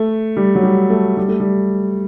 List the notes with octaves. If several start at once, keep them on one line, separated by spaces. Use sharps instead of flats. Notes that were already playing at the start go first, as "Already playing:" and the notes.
Already playing: A3
G3
F#3
G3
A3
G3
A3
G3